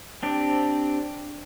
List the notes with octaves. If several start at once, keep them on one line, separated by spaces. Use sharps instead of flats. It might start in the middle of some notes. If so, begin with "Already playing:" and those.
C4 D4 G4